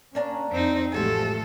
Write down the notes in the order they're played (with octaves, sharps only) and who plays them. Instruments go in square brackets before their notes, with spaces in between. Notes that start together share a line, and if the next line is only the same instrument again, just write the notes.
[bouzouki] A#3 D4 A#5 [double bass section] C#4
[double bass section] F2 [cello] C4 D#4
[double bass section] A1 F3 A3 [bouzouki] C3 F#4 G#5 [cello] G#3 A4